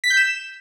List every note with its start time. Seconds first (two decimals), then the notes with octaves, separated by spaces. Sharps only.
0.04 B6
0.10 G6
0.17 E7